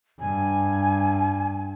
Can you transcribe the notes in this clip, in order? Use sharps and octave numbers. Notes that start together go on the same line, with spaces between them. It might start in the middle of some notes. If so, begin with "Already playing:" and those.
G2 G#5